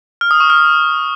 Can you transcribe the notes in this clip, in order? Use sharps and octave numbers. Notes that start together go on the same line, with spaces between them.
F6
D#6
C#6
F6